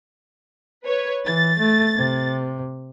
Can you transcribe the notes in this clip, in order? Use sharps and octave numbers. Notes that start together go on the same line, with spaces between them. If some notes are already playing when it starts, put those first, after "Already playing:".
B4 C#5
E3 A6
A3
C3